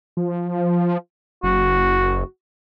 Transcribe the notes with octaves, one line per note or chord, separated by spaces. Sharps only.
F3
F#1 F#4